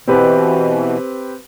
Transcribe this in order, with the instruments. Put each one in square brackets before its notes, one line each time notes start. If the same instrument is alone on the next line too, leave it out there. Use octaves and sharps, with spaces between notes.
[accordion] B2 E3 [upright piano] C4 G4 B4